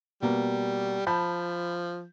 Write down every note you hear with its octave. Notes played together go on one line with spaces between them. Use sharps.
B2 G3 A#3
F3 A5 B5 G6